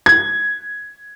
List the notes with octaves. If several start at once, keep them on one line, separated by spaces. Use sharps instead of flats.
G#6